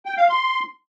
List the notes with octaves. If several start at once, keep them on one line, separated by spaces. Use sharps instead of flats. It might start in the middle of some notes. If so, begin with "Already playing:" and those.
G5
F5
C6